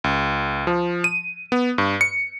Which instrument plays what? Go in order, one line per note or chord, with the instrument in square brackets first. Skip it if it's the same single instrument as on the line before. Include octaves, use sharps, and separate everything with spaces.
[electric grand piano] C#2
F3
D#7
B3
G2
C#7